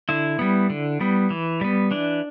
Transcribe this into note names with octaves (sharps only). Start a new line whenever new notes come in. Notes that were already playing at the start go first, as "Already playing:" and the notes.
D3 E4
G3 B3
D3
G3 B3
E3
G3 B3
E3 D4